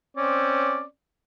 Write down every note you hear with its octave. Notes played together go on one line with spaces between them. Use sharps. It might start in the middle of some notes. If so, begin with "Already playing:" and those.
C4 C#4 D5